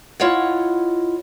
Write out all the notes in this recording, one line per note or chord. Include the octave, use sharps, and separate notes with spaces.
E4 F4 C#5 D#5 F#5